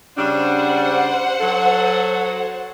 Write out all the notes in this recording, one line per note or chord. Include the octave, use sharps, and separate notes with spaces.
C#3 G3 D4 C5 F#5
F#3 A4